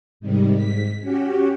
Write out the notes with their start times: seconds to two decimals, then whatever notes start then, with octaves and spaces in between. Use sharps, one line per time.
0.20 G#2 C3 D#3 G3
0.55 G#2 B6
1.01 C#4 F#4 G4